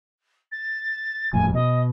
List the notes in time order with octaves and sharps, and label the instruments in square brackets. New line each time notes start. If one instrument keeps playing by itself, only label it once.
[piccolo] A6
[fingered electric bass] D#1 F2 A2 [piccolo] G#5
[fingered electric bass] B2 [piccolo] D#5